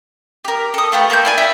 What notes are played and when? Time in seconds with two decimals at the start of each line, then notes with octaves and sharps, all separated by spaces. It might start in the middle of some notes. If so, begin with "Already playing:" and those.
0.45 G4 A#4
0.74 A4 D#6
0.92 A3 F4 G4 B4
1.10 A#3 A4 A#5 G6
1.25 E4 D5 G#5
1.38 E4 E5